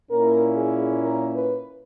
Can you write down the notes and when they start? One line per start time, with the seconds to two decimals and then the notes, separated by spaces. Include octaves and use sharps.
0.10 A#2 A#3 C#4 E4 A#4
0.56 G#4
1.02 A#4
1.33 B4